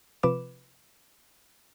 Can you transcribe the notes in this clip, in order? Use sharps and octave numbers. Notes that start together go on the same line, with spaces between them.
C3 F3 B4 D6 E7